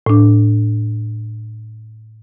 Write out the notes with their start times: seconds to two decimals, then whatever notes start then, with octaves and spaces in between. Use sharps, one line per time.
0.06 A2 D4